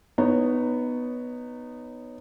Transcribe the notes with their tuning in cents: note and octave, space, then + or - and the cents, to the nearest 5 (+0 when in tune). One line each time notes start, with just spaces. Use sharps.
B3 +0 D#4 -15 C#5 +0